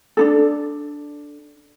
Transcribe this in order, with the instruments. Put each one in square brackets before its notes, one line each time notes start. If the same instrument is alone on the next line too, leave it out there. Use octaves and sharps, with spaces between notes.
[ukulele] D4 D#4 A4